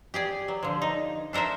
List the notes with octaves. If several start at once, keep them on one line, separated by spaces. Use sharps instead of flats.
G4 G#4 D5
F#3
D3 F3
D#4
D4 A4 A#4 C5 E5